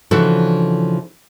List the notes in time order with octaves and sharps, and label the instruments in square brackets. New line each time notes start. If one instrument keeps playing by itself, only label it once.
[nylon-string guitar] C#3 E3 F3 D4 F#4 A4